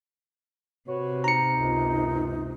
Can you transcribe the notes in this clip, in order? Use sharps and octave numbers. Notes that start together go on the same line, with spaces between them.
C3 F#4 B4 C#5
D#4 A#5 C#7
C#2 F#2